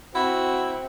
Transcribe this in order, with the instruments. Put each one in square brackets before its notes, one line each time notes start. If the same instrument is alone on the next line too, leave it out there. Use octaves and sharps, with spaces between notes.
[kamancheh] C4 [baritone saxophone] E4 [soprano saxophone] F#4